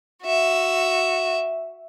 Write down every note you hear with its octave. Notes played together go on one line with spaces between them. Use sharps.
F#4 E5